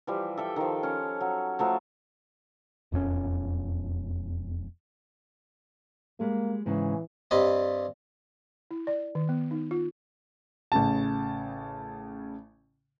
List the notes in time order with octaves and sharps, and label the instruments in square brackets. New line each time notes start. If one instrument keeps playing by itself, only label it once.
[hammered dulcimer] E3 F3 G3
A4 E5 G5
D#3 F3
C#4
F#3
F3 F#3 A3
[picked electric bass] E1 F2 G3 C#4
[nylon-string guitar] G3 G#3 G#4 [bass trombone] A#3
[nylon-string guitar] G#2 C#3 G#5 [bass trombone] E3
[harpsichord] G2 G3 C4 D#5
[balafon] E4
D5
D#3
B3
D#4
F4
[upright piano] A1 C#3 A5